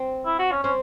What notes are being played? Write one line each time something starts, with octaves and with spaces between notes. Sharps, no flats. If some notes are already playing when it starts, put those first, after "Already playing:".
Already playing: C4
E4
F#4
C#4
C4 C#4